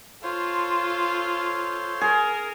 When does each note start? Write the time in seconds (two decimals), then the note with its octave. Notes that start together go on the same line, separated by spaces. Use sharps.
0.23 F4 A4 C5 C#5 C6
2.01 G#4 A#4